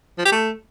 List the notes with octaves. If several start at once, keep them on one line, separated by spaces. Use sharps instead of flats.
F3
G4
A3